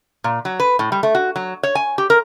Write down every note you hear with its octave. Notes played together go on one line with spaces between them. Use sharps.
A#2
F#3
B4
A2
G3
A3
F#4
F#3
C#5
G#5
G4
A#4